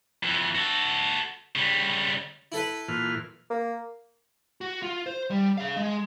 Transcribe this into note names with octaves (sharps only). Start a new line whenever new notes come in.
F2 E3
F#4 A4
C#3 G3
E4 A4 B4
A#2 E3 F6
A#3
F#4
F4
C5
G3
G#4 F5
G#3